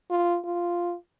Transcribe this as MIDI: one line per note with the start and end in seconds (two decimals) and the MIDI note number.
0.11 0.38 65
0.45 0.95 65